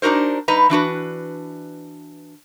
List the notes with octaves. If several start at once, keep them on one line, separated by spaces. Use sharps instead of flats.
D4 D#4 F#4 A#4 C5
G2 D#4 B4 A#5
E3 D4 F#4 B4